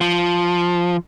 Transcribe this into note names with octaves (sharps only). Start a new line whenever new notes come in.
F3